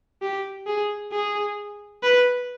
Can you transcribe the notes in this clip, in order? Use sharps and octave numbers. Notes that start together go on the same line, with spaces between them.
G4
G#4
G#4
B4